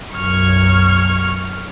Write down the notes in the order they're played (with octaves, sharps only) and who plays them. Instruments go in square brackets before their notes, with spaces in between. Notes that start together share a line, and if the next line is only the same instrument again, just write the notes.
[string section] B1 F#2 G#6 [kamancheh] C#6 F6